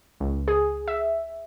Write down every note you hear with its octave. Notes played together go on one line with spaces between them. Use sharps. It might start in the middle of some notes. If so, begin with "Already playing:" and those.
C#2
G#4
E5